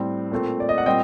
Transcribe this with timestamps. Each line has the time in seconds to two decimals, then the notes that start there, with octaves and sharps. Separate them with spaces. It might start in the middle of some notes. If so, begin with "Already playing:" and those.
Already playing: A2 G3 C4
0.32 A#2 A3 C4
0.60 D5
0.69 D#5
0.78 F#5
0.86 A#2 G3 C4 D#5 G5